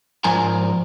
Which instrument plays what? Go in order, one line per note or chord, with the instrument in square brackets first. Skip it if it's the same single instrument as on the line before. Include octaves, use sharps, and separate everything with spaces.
[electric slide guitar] G#2 F3 A#4 D5 G#5 A#5